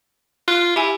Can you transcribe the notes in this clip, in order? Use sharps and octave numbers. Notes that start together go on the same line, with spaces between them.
F4 F#6
E4 G4 G#5 E6